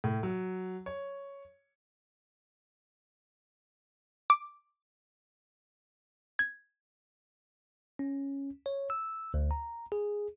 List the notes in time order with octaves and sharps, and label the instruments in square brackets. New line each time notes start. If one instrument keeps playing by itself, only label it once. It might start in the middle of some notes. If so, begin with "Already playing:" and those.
[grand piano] A2
F#3
C#5
[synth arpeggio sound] D6
[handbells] G#6
[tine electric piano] C#4
C#5
E6
D2
A#5
G#4